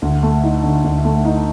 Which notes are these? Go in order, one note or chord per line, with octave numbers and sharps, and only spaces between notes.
D2
A3
D#4
D3
D2
A3
D#4